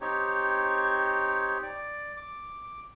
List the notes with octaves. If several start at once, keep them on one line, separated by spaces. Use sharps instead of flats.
C4 D#4 G4 C#5
D5
D6